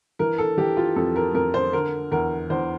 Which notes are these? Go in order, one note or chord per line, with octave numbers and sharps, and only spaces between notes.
E3 A#4
A4
E3 G4
F4
F2 A4
A#4
F2 A#4
C5
D3 A#4
E2 A#4
E2 C5